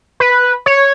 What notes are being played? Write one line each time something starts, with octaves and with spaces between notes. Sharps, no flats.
B4
C#5